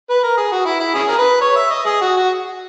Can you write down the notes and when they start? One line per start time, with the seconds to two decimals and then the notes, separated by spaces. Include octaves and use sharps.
0.10 B4
0.23 A#4
0.37 G#4
0.52 F#4
0.66 E4
0.80 E4
0.95 C#4 E4 G#4
1.08 A#4
1.19 B4
1.41 C#5
1.56 E5
1.71 D#5
1.86 G#4
2.02 F#4
2.17 F#4